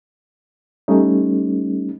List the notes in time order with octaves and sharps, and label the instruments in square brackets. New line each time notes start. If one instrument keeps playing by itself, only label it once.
[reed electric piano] G3 A3 C#4 D#4